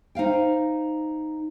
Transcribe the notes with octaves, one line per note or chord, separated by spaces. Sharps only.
D#4 C5 F5 G5